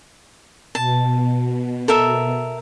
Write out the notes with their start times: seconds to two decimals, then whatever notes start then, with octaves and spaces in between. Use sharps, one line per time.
0.75 B2 A5
1.88 A4 A#4 E5